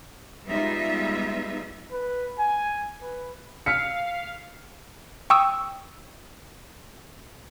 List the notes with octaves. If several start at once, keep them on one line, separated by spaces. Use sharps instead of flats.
G3 G#3 B3 D#4 F4 E5
B4
G#5
B4
F5 F6 B6 C#7
G5 C#6 D#6 E6